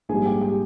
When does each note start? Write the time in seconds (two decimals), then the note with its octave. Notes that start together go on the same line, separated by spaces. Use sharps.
0.09 A#1 G#2 G3 G#4 G#5
0.25 G4 G5
0.41 G4 G5